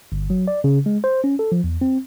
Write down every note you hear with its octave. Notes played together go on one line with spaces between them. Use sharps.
G1
F#3
D5
C#3
G#3
C5
C#4
A4
F3
E2
C4